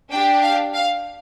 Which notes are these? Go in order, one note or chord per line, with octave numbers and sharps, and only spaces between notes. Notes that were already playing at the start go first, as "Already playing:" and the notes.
D4 G4 G5
F5
F5